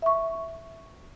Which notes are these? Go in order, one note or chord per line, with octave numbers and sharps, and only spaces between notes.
E5 C#6